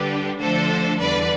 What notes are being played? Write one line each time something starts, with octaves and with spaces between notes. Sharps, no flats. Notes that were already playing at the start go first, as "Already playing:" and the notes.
Already playing: D3 G3 D4 G4 B4
D3 F3 A3 D4 A4 C5
E2 D3 G3 B4 D5